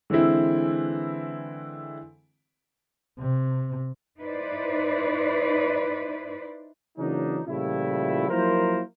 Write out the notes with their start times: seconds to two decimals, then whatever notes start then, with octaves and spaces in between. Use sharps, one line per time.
0.10 D3 E3 G#3 C4 E4
3.19 C3
4.19 D#4 E4 B4 C5 D5
6.98 C#3 E3 F#3 A#3 D4 D#4
7.47 A#2 C#3 F3 G3 A3 E4
8.30 F3 F#3 A#3 E4 A#4 C5